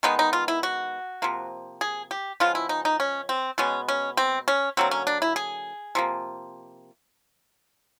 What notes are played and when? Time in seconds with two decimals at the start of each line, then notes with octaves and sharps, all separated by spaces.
0.03 D#3 G#3 B3 D#4
0.19 D#4
0.33 F4
0.48 E4
0.63 F#4
1.22 C3 F3 A#3
1.81 G#4
2.11 G4
2.40 C#3 F3 G#3 B3 F4
2.55 E4
2.69 D#4
2.85 D#4
3.00 C#4
3.29 C4
3.58 B2 G#3 B3 C#4
3.88 C#4
4.17 C4
4.48 C#4
4.77 D3 F#3 A#3 C4
4.91 C#4
5.07 D4
5.22 E4
5.36 G#4
5.95 C3 F3 A#3